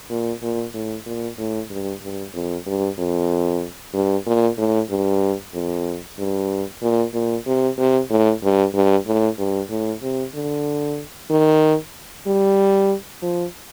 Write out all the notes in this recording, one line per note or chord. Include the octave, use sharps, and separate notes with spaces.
A#2
A#2
A2
A#2
A2
G2
G2
F2
G2
F2
G2
A#2
A2
G2
F2
G2
A#2
A#2
C3
C3
A2
G2
G2
A2
G2
A2
C3
D3
D#3
G3
F3